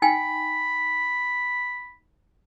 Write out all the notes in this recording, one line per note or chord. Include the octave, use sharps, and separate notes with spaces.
D#4 G5 G#5 B5